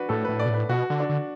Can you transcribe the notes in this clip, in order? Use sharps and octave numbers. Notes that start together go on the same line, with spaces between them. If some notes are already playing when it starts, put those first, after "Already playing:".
Already playing: D4 F#4 B4
A2 A4
B4
A2
D5
B2
A2 B4
B2 F#4
D3
D4
D3